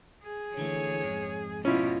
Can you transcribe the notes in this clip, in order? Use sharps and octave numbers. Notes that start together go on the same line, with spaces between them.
G#4
D3 E3 A3 C#5
F2 G#2
B2 C#4 E4 F4